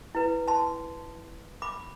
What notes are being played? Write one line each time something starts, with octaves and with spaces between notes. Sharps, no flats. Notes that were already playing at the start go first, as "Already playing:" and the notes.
E4 B4
A5 C6
B5 D6